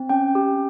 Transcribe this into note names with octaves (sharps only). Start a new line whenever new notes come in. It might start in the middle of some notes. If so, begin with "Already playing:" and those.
Already playing: C4
C#4 G5
G4